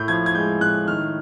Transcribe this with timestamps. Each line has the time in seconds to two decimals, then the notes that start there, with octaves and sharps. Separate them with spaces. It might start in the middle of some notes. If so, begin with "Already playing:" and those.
Already playing: A2 G6
0.08 F3 G#6
0.26 G#6
0.35 G#3 G6
0.61 A2 F#6
0.87 D#3 F6